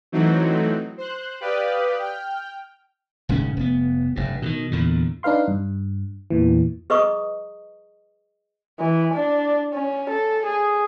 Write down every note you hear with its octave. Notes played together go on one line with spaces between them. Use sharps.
E3 F#3 A3 C4 D#4 F#4
C5 F#6
G4 B4 D5 F5 D#6
G5 F6
D#1 G#2 C#3 C#4
F1 B3
F1 G2
B2 D3 D#3
E2 A#2 D3
D4 D#4 B4 F5 C6
G2
E2 A#2 E3
G#4 B4 D#5 A#5 C#6 D#6
E3
D4
C#4
A4
G#4